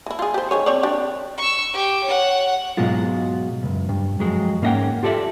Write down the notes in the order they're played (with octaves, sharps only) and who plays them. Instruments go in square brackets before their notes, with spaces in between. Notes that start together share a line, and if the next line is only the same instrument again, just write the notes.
[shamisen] E3 E4
F4 G#4
G4 C5
D#3 G#4 C#5
C4 C#5 D5
D4 G4
[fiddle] C#6 E6
G4
C#5 F#5
[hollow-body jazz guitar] G#2 B2 F#3 G#3 F4
C#2 F#2
G2
F2 F#3 G#3
G#2 A#3 C#4 D#5 F#5 G5
F4 G4 A4 C5 D5 E5